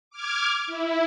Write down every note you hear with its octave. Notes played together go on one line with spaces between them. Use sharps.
D6 F6 G#6
E4